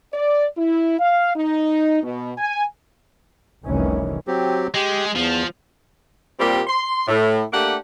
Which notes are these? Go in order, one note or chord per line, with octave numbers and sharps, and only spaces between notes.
D5
E4
F5
D#4
B2
G#5
F1 C2 C3 D#3 E3 C#4
F#3 C4 G4
G#3 G4
E2 F3
A#2 G3 A#3 C4 F4 G4
C6
A2
A3 A#3 D4 G4 F#5